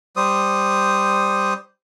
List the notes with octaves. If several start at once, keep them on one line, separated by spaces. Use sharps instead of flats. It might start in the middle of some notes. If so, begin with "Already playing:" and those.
G3 C5 D#6